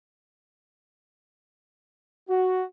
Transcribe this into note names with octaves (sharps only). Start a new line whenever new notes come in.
F#4